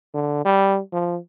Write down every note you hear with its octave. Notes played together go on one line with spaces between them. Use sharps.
D3
G3
F3